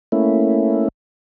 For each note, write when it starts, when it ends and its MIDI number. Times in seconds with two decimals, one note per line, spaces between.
0.12 0.88 57
0.12 0.88 58
0.12 0.88 61
0.12 0.88 64